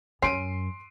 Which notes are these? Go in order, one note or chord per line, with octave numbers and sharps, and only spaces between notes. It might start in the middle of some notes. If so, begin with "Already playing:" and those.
F#2 C#4 C6 C7 D7 D#7